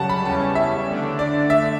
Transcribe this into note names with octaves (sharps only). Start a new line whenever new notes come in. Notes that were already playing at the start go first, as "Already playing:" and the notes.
Already playing: F#2 C#3 G3 F#5 A5
B5
E2 C#3 G3 C#4 A5
E5
D3 A3 D4
D5
E5